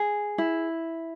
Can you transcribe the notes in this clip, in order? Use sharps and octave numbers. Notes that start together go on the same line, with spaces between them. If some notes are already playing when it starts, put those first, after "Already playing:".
Already playing: G#4
E4